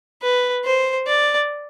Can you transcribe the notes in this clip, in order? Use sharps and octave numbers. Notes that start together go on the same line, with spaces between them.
B4
C5
D5